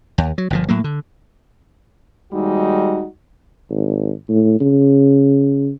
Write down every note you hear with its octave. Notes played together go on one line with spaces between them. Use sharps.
D#2
F#3
G1 A#2 F3
A2 F#3 A#3
D3
D#2 G3 G#3 D#4 F#4
G#1
A2
C#3